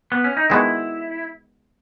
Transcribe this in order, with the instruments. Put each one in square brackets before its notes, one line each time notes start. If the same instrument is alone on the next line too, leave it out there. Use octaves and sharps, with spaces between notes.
[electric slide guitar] B3
C#4
D#4
[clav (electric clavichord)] D#3 G#3 B3 D#4 F#4 [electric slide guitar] E4